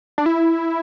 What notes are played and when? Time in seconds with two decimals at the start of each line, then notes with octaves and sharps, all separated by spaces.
0.18 D4
0.26 E4